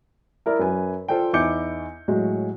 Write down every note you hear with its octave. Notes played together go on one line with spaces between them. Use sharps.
E4 A#4 D5
F#2 B4 G#5
F4 A4 C5 D5 G5
E2 D#4 E4 D6 G6 C#7
A2 F#3 G#3